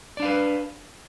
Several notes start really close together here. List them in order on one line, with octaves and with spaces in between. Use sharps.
D5 D4 F5 B4